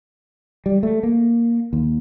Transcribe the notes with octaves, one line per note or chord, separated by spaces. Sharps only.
G3
A3
A#3
D#2